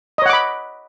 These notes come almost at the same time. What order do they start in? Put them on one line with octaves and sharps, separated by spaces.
D#5 C#5 F#5 D6 B5